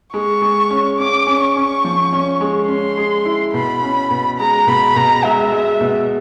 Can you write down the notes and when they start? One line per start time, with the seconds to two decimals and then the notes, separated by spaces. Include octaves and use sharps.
0.13 G#3 C#6
0.42 G#3
0.70 C#4
0.99 C#4 D6
1.27 C#4
1.41 C#6
1.56 C#4
1.85 F3
2.13 C#4
2.41 G#3
2.68 C#4 C6
2.98 G#3
3.25 E4
3.54 B2 B5
3.83 C#4
4.11 B2
4.40 G#3 A#5
4.67 B2 B5
4.96 B2 A#5
5.24 G#3 E5
5.52 G#3
5.81 B2